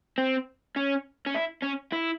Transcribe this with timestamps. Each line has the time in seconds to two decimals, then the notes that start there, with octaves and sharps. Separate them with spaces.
0.18 C4
0.76 C#4
1.27 C#4
1.35 E4
1.63 C#4
1.93 E4